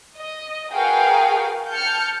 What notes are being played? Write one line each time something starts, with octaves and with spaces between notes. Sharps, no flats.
D#5
F#4 G#4 A#4 B4 F5 G5
A5 F6 G6 C#7